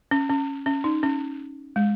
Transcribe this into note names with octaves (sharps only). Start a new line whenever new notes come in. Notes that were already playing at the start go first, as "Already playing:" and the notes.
C#4
C#4
C#4
D#4
C#4
G#3